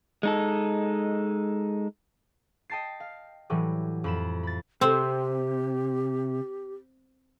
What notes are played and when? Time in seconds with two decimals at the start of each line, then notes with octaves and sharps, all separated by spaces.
0.23 G#3 D#4 A4
2.70 D#5 G5 A5 A6 C7
3.00 F5
3.50 A2 E3 F#3 G3
4.04 F2 B5 E7
4.43 B5 A6
4.81 C3 C4 G4